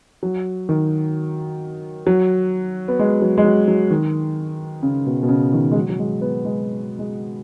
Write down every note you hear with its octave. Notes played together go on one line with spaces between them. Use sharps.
F#3
D#3
F#3
B3
G#3
F#3
G#3
F#3
F#3
D#3
C#3
B2
B2
C#3
D#3
G#3
F#3
F#3
G#3
B3
G#3
G#3